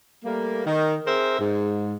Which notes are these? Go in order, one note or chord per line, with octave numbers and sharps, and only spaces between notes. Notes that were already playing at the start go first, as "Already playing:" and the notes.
G3 A3 A#3
D#3
C4 G#4 A#4 C5 E5
G#2